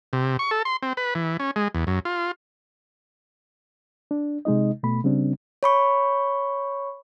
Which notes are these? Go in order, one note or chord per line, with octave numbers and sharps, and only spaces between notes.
C3
C#6
A4
C6
C4
B4
E3
C#4
G#3
E2
F#2
F4
D4
C3 G#3 D#4 D#5
B2 A3 B5
C#3 G3 C4 D4
C#5 B5 C#6